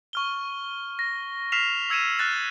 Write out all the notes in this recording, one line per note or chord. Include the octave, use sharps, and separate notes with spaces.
C#6 F6 G7
A#6
F6 B6 C7 E7 F7
E6 G#6 C#7 D#7 E7
F6 F#6 A6 E7